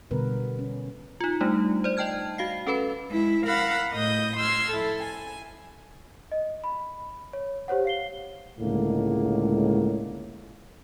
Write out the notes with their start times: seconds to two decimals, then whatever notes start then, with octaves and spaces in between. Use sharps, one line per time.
0.11 B2 D3 G3 B3 A#4 B4
0.59 C#4
1.21 D#4 F4
1.41 G3 A3 D4 D#4
1.84 C5 D5
1.97 D5 D#5 G5 A5 F6 G#6
2.38 F#4 F5 C7
2.67 C#4 A4 B4 B5
3.10 G#3 E4
3.45 A#4 F5 F#5 B5 E6
3.93 A2 D#5 D#6 G6
4.38 C6 E6 F6 G#6
4.70 E4 A4
5.00 G#5
6.32 D#5
6.64 B5
7.33 C#5
7.68 G4 C5 C#5 F#5
7.85 F5 C7 G7
8.59 C#2 A2 D3 G#3 A#3